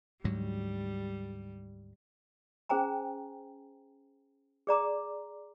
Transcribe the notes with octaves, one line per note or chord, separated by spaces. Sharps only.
D2 G#2 F#3 G3
C#4 G#4 C5 G5 G#5 A#5
G#4 D5 A#5 D6